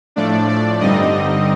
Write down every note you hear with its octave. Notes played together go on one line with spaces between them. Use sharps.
A2 F3 A3 D4 D5
D5
G2 D3 G3 C4 D#4 D#5